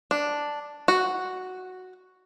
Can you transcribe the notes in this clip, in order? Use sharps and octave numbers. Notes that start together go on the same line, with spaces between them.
D4
F#4